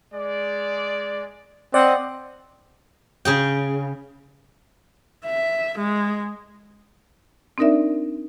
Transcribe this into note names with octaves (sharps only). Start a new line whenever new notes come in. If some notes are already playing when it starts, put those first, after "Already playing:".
G#3 D5
C4 D5 D#5 F#5
C#3 G#4 G5
E5
G#3
C4 D4 D#4 A#4 D5 E5